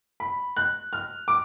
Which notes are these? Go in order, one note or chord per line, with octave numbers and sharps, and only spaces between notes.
B5
F#6
F6
D6